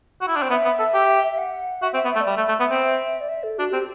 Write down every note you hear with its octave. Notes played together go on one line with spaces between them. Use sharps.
F#4
E4
D4
C4
B3 E5
B3
A4
G4
F#5
F#4 E5
C4
E5
B3
A3 E5
D5
G3
E5
A3
A3
B3
C4
D5
E5
A4
D4 F#4
C4 G4